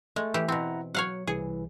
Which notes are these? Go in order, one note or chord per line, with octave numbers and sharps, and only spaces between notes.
G#3 A3
E3 G4
B2 C4 E4 F#5 A#5
F#3 C#5 F5 F#5
C2 E3 G#4